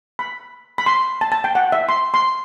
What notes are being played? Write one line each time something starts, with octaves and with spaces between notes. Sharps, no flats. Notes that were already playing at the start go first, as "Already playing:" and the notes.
B5
B5
C6
A5
A5
G5
F#5
E5
C6
C6